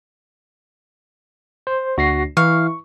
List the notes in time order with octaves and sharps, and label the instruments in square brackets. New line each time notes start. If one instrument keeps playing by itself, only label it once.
[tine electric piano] C5
[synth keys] D2 [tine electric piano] F#4 A#6 C7
[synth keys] E3 [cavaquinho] F5 [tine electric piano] C#6